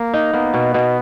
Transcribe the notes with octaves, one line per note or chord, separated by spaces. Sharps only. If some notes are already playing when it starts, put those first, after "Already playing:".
Already playing: A#3
D#4
A#3 B3
B2
B2